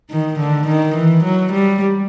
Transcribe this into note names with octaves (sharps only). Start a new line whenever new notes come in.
D#3
D3
D#3
E3
F#3
G3